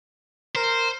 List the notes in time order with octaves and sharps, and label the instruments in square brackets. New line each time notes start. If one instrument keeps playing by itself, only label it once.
[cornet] A#4 [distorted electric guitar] C5